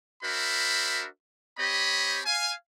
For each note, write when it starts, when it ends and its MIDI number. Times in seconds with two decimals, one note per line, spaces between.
0.24 1.05 62
0.24 1.05 66
0.24 1.05 70
0.24 1.05 72
0.24 1.05 76
0.24 1.05 83
1.58 2.19 60
1.58 2.19 67
1.58 2.19 73
1.58 2.19 75
1.58 2.19 83
2.25 2.52 77
2.25 2.52 80